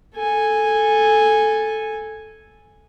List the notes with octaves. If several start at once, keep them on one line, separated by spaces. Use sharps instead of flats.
A4 G#5